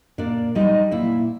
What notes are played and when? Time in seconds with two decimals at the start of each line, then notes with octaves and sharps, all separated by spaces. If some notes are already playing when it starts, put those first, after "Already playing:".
0.18 A#2 D4 D5
0.55 G3 D#4 D#5
0.91 A#2 E4 E5